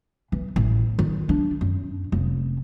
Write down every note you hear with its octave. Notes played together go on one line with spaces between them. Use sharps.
E3
A1
D#3
D4
F#2
F1